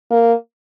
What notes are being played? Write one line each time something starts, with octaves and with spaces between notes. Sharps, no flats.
A#3